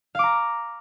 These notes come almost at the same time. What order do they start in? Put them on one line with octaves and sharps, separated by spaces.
F5 D6 A#5